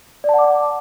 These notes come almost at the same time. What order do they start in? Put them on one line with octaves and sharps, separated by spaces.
D5 A5 F#5 D6